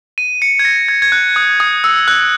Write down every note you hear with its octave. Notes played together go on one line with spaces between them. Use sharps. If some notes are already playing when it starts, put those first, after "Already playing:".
D#7
C#7
G#6
A#6
G#6
G#6
F#6
D#6
D#6
E6
F#6